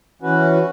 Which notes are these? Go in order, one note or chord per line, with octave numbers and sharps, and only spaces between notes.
E3 C#4 F#4 B4